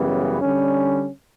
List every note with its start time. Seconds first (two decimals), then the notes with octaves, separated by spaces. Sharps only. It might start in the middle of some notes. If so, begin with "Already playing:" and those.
Already playing: F#2 C#3 E3 G3 B3
0.40 D3 G3 C#4